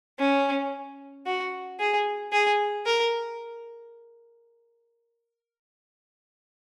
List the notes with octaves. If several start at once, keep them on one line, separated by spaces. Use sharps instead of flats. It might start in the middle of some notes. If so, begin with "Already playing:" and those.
C#4
F#4
G#4
G#4
A#4